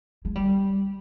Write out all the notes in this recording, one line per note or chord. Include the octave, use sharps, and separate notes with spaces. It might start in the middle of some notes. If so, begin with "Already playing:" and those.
G#3
G3